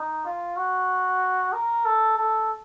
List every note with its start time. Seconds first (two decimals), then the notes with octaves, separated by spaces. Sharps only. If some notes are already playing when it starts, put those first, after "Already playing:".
Already playing: D#4
0.25 F4
0.57 F#4
1.53 A#4
1.85 A4
2.18 A4